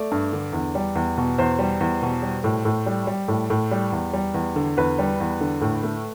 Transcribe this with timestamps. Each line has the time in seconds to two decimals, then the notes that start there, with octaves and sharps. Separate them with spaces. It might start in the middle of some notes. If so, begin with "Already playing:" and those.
Already playing: A3 D5
0.11 G2
0.33 D3
0.53 E2
0.75 G3
0.95 E2
1.18 B2
1.38 E2 C5
1.59 G3
1.81 E2
2.02 B2
2.22 G3
2.44 A2
2.65 A2
2.86 G3
3.07 G3
3.28 A2
3.50 A2
3.71 G3
3.92 E2
4.14 G3
4.34 E2
4.56 D3
4.77 E2 B4
4.99 G3
5.20 E2
5.41 D3
5.62 A2
5.83 A3